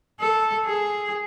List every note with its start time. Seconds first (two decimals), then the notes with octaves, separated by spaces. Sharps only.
0.20 A4
0.66 G#4